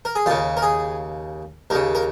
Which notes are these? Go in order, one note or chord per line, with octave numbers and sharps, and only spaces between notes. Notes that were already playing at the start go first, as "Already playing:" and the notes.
A#4
G#4
D#2 C#3 F4
A#4
G#4
D#2 C#3 A#4
A#4